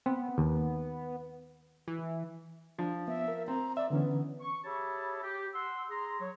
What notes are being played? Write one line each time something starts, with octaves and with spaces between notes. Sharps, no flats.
B3 C4
D#2
E3
F3 D4
B3 E5
A#4
C4 A#5
D5 E5
D3 E3 B3 C#4
C#6
G4 G#4 C#5 E5 A5 B5
G4
F#5 C6 E6
G#4 A#5 C6
F#3 C#5